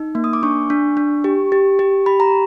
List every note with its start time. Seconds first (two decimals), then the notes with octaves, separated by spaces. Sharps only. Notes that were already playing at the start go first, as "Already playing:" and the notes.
Already playing: D#4
0.15 A#3
0.24 D#6
0.33 D6
0.43 D4 C#6
0.70 D4
0.97 D4
1.24 G4
1.52 G4
1.79 G4
2.06 G4 B5
2.20 A#5